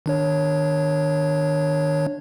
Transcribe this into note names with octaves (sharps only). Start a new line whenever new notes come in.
D#3 D4 C#5